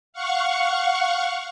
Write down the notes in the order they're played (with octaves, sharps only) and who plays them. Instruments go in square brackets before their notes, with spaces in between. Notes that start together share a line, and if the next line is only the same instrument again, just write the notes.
[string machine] F5 F#5 C#6